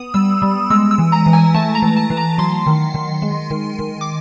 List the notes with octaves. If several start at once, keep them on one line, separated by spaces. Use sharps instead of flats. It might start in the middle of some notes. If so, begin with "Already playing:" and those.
Already playing: B3 D#6
G3 E6
G3
G#3 E6
E6
E3
A#5
E3
G#5
A3 A5
A#5
E3
A5
E3
A#5
F#3 C6
D#3
D#3
G#3
D#3
D#3
D6